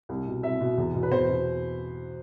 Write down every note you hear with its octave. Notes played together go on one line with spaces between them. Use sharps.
C2
B2
C2 E5
B2
E2
B2
B4
E2 C5
B2